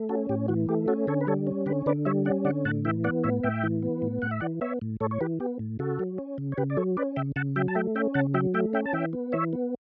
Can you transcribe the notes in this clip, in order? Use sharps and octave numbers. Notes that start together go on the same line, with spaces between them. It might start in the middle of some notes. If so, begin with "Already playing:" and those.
Already playing: A3
C#4 F#4 A4
A2 G4
E3 F#4
A3 G4
C#4 F#4 A4
D3 A4 C#5
B4
G3 A4 C#5
C#4
D3 G4 B4
D3 B4 D5
G3 C#5 E5
C#4 D5 F#5
D3 D5 F#5
A2 F#5 A5
E3 E5 G5
B3 D5 F#5
A2 C#5 E5
A2 E5 G5
E3
B3
A2
A2 F#5
E5
E3 D5 F#5
B3 C#5 E5
A2
A2 A4 C#5
C#5
E3 G4 B4
B3 G4
A2
C#3 F#4 A4
F#3
C#4
C#3
C#5
C#3 G4 B4
D5
F#3 A4 C#5
C#4 B4 D5
C#3 E5 G5
C#3 F#5 A5
F#3 E5 G5
A5
A3 E5 G5
C#4 E5 G5
C#3 F#5 A5
F#3 E5 G5
A3 E5 G5
C#4 E5 G5
A5
E3 E5 G5
B3
E3 C#5 E5
B3